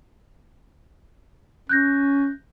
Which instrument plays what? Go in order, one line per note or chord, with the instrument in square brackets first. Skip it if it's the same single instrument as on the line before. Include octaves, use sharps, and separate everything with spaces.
[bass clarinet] C#4 [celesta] F#6 G6 A#6